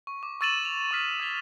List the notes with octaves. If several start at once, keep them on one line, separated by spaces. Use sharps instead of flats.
C#6
D6
C#6 E6 A6 D#7 E7 F#7
F7
C#6 D#6 F6 B6
E6 G#6 B6 G7